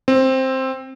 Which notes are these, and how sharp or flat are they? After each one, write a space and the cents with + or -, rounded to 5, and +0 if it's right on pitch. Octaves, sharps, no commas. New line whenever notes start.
C4 +10